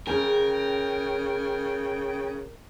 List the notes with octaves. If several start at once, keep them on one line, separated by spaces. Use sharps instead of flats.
C#3 C#4 G#4 A#4 G5